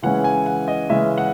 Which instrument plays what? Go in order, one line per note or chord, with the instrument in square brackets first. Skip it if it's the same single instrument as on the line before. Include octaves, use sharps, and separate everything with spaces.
[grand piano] C#3 E3 G#3 C#4 F#5
G#5
F#5
D#5
C#3 E3 G#3 C#4 E5
F#5